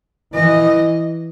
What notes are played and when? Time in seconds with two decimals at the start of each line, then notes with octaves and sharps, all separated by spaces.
0.34 E3 D#5